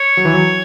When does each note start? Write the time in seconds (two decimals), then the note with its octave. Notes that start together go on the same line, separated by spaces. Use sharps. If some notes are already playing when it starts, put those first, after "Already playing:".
Already playing: C#5
0.17 F#3
0.25 E3
0.34 F#3